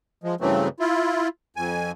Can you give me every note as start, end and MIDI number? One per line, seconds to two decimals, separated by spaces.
0.24 0.35 53
0.24 0.35 56
0.41 0.68 43
0.41 0.68 49
0.41 0.68 52
0.41 0.68 54
0.41 0.68 57
0.41 0.68 60
0.80 1.28 64
0.80 1.28 65
1.56 1.91 41
1.56 1.91 80